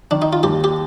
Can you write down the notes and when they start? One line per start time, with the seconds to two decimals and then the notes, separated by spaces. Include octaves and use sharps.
0.11 D#3 D4
0.22 D#4
0.33 F4
0.43 D#2 G4
0.64 G4